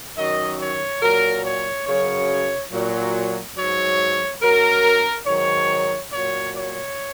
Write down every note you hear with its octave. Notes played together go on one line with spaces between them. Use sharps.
F#2 D#3 F#3 D#5
C#5
A#2 F#3 A#4
C#5
F#2 C#3 F#3 C#5
A#2 F#3
G#2 F#3 C#5
F#2 F#3 A#4
G#2 D#3 F#3 C#5
A#2 F#3 C#5
C#5